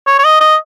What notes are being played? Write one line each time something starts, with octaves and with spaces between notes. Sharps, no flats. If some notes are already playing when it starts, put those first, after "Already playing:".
C#5
C#5
D#5
D#5